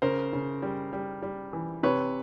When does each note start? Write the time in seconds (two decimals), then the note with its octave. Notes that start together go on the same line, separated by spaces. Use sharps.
0.02 C#3 A#4 C5
0.33 C#3
0.62 G3
0.93 G3
1.23 G3
1.53 E3
1.83 C3 B4 C#5